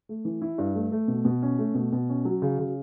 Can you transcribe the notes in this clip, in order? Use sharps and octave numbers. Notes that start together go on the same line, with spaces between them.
A3
E3
E4
G2
A3
A3
B2
B2
C#4
A3
B2
B2
C#4
F#3
C#3
C#3